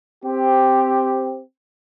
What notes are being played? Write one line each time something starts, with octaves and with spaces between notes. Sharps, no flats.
C4 G4